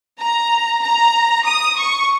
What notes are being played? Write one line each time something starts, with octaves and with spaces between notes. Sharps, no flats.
A#5
A#5
D#6
C#6